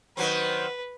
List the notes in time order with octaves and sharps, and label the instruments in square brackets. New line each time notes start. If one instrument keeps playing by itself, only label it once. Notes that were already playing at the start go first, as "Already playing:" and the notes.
[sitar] D#3 F#3 C4 [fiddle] B4